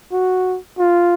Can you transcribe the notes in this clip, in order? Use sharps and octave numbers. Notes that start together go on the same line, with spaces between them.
F#4
F4